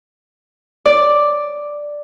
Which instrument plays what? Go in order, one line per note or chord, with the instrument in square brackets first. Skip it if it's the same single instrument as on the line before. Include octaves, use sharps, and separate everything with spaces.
[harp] D5